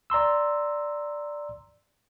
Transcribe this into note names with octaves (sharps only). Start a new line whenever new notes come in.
D5 A#5 C6 E6